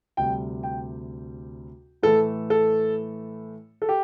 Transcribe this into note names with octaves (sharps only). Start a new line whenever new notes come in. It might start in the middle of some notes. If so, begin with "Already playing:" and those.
D2 C3 G3 G5
G5
A2 E3 A3 A4
A4
A4
G4